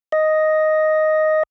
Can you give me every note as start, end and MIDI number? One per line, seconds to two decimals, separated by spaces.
0.12 1.43 75